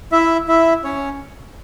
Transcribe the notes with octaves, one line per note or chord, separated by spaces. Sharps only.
E4 E5
E4 E5
C#4 C#5